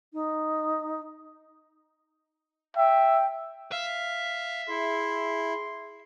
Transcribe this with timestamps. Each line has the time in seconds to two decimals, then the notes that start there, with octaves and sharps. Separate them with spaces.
0.13 D#4
2.77 E5 G5
3.72 E5 F5
4.69 E4 G#4 C6